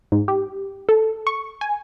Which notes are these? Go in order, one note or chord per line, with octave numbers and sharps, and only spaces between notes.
G#2
G4
A4
C#6
G#5